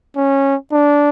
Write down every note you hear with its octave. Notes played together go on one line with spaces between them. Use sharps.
C#4
D4